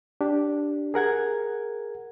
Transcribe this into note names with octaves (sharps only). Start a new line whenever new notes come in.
D4 G4
G#4 A#4 F#5 G#6